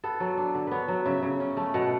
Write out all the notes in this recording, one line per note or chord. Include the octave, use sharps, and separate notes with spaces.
B3 A4
F#3
D4
D3
B3 B4 C#5
F#3
C#3 E5
C#3
C#4
A3
B2 F#5